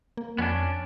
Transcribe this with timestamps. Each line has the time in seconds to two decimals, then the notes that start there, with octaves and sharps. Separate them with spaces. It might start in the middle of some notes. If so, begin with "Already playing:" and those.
0.17 A#3
0.38 F2 B3 C#4 D4